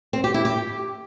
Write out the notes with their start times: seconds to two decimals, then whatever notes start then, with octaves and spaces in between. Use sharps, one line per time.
0.13 C4
0.24 G4
0.34 E4
0.45 G4